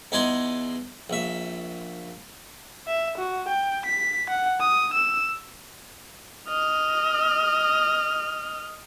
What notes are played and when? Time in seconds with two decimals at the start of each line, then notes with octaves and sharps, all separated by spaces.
0.12 E2 D#4 D5 G#5 C6
1.10 A#1 E5
2.87 E5
3.17 F#4
3.48 G5
3.86 B6
4.30 F#5
4.61 D#6
4.93 E6
6.48 D#5 F6